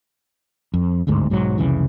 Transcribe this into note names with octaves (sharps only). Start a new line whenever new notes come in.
F2
D1 G1 D2 G#2
B1 G#2 E3 F#3
F1 C2 C#3 E3